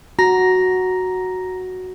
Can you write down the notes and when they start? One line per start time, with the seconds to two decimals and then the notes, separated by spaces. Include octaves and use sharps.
0.19 F#4 A#5 A#6